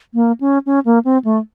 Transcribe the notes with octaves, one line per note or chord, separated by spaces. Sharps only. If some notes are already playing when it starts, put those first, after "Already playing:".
A#3
C#4
C#4
A#3
C4
A3